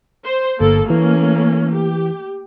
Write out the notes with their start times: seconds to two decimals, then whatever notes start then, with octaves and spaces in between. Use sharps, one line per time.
0.24 C5
0.61 G1 A#3 A4
0.90 E3 A3 A#3 C#4
1.75 G4